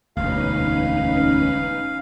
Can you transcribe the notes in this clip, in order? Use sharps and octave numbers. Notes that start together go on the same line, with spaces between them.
E1 D2 C#4 D#4 B4 F5